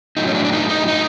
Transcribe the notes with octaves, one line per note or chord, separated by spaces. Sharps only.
A2 F#3 D#4
C#4
D4
D4
D#4
D#4
D#4